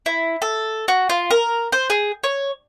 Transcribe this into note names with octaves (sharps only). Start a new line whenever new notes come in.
E4
A4
F#4
F4
A#4
C5
G#4
C#5